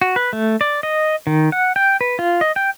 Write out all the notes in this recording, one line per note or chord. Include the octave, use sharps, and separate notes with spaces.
F#4
B4
A3
D5
D#5
D#3
F#5
G5
B4
F4
D#5
G5